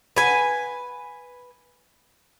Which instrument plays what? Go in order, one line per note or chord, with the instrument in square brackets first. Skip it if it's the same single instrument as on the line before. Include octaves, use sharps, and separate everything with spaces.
[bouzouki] B4 G#5